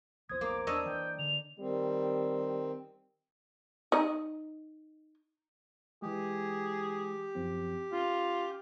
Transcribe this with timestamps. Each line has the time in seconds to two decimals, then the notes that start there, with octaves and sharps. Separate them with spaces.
0.29 A#1 E2 C5 D#6 G#6
0.41 A#3 D6
0.67 E2 D4 C#5 D#5 E6
0.86 E3 G5
1.19 D3 F7
1.59 D#3 G3 C4
3.92 D#4 D#5
6.02 E3 G#3 G4 G#4
7.35 F#2 F3 C4
7.93 C#4 F4